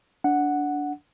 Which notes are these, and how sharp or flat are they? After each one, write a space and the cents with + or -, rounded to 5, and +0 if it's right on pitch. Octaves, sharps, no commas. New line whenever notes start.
D4 -15 F#5 +0